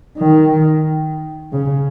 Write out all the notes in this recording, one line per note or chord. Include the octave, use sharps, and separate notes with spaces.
D#3
C#3